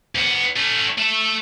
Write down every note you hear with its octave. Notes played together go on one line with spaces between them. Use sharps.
D2 B3
A3 C#4
A3 E5